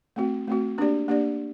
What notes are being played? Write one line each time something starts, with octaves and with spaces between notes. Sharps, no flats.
A3 C4 F#4
A3 C4 F#4
A#3 D4 G4 D5
A#3 D4 G4 D5